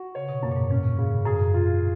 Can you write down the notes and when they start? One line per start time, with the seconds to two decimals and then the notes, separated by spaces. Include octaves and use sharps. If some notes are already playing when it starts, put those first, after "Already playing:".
Already playing: F#4
0.15 C#3 C#5
0.29 B2
0.42 F#2 A#3
0.52 A#2
0.56 G#2
0.70 A#2 C#4
0.98 G#2 C#3
1.26 F#2 G#4
1.54 F4